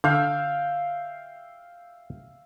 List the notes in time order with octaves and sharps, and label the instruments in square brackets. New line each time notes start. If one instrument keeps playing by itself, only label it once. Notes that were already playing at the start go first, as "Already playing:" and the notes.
[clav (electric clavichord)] D3 [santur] E5 F5 G5